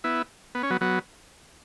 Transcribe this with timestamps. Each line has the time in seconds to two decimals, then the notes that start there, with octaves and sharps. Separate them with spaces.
0.04 B3 E4
0.55 B3
0.63 C#4
0.70 F#3 B3
0.81 F#3 B3